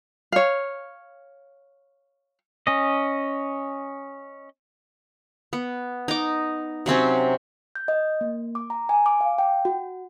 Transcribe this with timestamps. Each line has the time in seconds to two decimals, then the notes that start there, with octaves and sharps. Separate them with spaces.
0.32 C#5 F5
2.67 C#4 D#5
5.53 B3
6.08 D#4 D6
6.86 C3 F#3 C4 C#4
7.75 G6
7.88 D#5
8.21 A#3
8.55 D6
8.70 A#5
8.89 G#5
9.06 D6
9.21 F5
9.38 G5
9.65 F#4